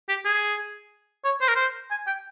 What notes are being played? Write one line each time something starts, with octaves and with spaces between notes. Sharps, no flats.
G4
G#4
C#5
C5
A#4
C5
G#5
G5